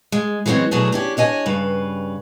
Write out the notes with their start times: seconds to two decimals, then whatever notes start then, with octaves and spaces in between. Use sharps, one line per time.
0.12 G#3
0.46 E3 F#3 G#3 C4 C#4
0.71 B2 F#3 A3 D4 G#4
0.92 C#4 D4 G4
1.17 D4 C#5 D#5 G#5
1.46 G2 C#3 B4